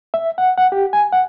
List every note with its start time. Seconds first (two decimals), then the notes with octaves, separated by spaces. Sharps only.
0.14 E5
0.38 F#5
0.58 F#5
0.72 G4
0.93 G#5
1.12 F#5